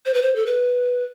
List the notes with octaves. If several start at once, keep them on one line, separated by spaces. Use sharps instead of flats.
C5
B4
C5
A4
B4